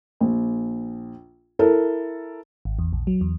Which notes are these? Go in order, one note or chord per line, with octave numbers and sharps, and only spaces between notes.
A#1
E4 A4 A#4
G#1
E2
A#1
F#3
E2